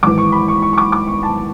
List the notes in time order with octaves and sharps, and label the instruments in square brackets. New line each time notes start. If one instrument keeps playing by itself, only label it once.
[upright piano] G#1 G#2 E3 D6
C#6
B5
C#6
C#6
C#6
D6
D6
C#6
A5